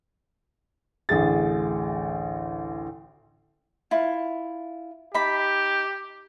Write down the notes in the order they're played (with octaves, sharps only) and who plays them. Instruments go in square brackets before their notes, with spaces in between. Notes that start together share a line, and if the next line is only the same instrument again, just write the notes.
[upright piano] A1 D2 G#4 A6
[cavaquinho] E4 F4
[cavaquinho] D#4 A5 B5 [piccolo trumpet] G4